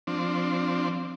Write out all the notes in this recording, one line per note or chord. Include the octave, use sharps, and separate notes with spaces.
F3 C4 D4